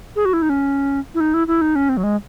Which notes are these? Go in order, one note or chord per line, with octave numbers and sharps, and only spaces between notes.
G#4
F#4
E4
D#4
C#4
E4
D#4
E4
E4
D#4
C#4
C4
F#3
G#3